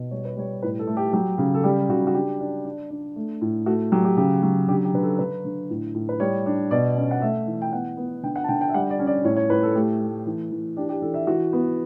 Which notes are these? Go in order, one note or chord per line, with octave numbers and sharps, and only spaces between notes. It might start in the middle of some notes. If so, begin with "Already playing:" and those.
Already playing: B2
G3 C#5
B4
G3 C#5
A2 B4
A4
A3
G4
F#3 G4
C#3
A4
G3 G4
C#3 F#4
F#4
D4 G4
D4
D4
D4
A3
A2
A3 F#4
F#3 G4
G4
C#3 G4
F#3
D3 G4
G4
D3 B4
A4
D3 B4
D3
A2
A2
B4
G3 C#5
D4
B2 D5
C#4
F#5
A3 E5
E3
G5
B3 F#5
B3
D3 G5
F#5
A5
D3 G5
G5
E5
G3 F#5
D5
C#4
D5
A2 C#5
C#5
A2 B4
A4
A3 G4
A3
E3
E3
D4 G4
G4
E3 A4
E5
E3 F#4
B3